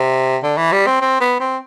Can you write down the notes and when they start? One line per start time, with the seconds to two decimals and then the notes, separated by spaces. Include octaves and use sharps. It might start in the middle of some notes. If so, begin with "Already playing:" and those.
Already playing: C3
0.43 D3
0.58 E3
0.72 G3
0.87 C4
1.01 C4
1.21 B3
1.40 C4